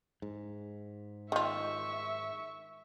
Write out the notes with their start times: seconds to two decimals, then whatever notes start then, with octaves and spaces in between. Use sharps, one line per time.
0.22 G#2
1.32 D#3 F4 E5 C#6